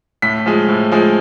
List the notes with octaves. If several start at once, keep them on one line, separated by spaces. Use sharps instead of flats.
A2 B6
F3 G#3
A2
F3 G#3